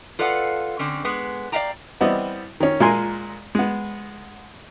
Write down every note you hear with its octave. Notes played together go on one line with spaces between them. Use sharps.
F4 A4 B4 D5 F5 F#5
D3 C4 C#4
G#3 B3
D5 E5 F5 G5 A#5
E3 G3 B3 C4 E4 D#5
D#3 C#4
A#2 G#3 A#4 G#5 C6
G#3 B3